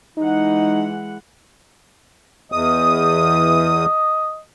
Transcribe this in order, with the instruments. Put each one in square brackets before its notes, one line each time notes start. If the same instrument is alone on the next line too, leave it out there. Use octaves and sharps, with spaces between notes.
[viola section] E3 G#3 F#5 [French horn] D#4
[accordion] E2 D#6 [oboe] D#5